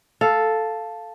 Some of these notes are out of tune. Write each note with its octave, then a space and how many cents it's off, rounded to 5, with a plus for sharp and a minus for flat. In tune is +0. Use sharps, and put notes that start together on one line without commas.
A4 +0 F5 +0